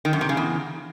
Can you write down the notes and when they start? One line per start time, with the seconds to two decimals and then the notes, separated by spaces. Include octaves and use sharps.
0.05 D#3
0.13 F#2
0.21 C3
0.29 C#3
0.37 E2